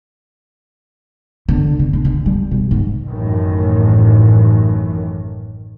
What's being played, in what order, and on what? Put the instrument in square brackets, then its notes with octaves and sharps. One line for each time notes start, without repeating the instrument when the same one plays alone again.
[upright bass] D3
D3
A#1
D3
G3
B2
G#2
[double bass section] A1 F#2 A2 D#3 E3